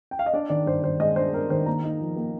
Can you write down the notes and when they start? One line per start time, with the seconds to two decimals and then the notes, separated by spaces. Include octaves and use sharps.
0.11 G5
0.19 F5
0.26 D#5
0.33 D4 D5
0.50 D#3 D5
0.66 G2 C5
0.83 D#3 C5
1.00 G#3 D#5
1.16 D4 C5
1.34 D4 A#4
1.50 D#3 C5
1.66 A#3 A#5
1.84 D#4
2.01 F3
2.16 A#3